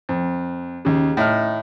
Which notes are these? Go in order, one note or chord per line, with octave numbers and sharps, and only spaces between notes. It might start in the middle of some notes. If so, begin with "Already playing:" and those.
F2
D#2 C#3
A2 D#4 F6